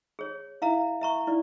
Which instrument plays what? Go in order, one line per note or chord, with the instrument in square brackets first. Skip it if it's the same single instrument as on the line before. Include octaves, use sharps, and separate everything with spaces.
[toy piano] G#4 C#5
E4 E5 F5 A#5
E5 A#5 C#6
E4 D5